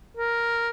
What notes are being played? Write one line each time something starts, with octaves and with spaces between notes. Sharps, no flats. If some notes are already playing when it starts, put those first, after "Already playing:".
A#4